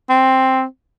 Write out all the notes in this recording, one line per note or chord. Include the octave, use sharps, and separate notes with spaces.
C4